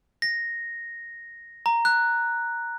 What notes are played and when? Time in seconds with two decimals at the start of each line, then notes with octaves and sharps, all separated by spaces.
0.22 A#6
1.66 A#5
1.85 F#6